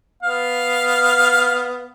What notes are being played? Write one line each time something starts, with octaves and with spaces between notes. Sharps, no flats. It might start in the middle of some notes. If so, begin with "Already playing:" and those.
B3 F5